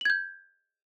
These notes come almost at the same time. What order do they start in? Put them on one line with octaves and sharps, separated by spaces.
F#7 G#6 G6